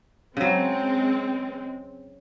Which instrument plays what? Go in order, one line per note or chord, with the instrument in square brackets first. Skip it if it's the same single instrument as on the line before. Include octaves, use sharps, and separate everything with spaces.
[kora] C#3 F#3 [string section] G#3 C4